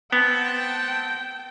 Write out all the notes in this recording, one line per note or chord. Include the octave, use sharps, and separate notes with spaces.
B3 C4 F#5 G5 A5